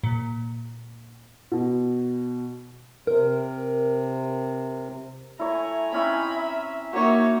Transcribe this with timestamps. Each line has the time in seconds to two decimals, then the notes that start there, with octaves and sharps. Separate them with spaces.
0.04 A#2
1.52 B2
3.07 C3 A#4
5.39 A3 E4 C#5 G#5 A#5
5.92 C4 C#4 D#4 E4 B5
6.37 E5
6.93 A#3 D#4 F#4 C#5 C#6